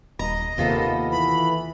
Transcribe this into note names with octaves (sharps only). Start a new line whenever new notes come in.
D#1 D#5 A#5
D#2 C3 A#3 B3 F4 A4
E3 B5